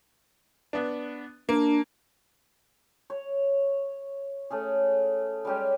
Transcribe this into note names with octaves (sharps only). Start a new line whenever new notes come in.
B3 D4
A#3 D4
C#5
A3 C#4 G#4
G3 G#3 C#4 G4